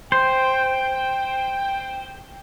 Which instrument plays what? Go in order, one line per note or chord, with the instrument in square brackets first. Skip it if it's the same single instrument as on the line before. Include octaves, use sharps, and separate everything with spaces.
[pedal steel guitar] C5 [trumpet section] G5